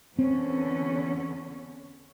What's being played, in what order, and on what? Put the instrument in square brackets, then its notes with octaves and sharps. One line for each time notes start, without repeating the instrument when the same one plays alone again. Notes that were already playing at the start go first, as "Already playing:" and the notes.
[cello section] E2 D3 C#4 [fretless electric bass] C4